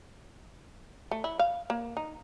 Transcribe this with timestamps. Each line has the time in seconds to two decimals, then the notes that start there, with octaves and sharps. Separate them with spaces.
1.11 A3
1.24 E4
1.39 F5
1.70 A#3
1.97 D#4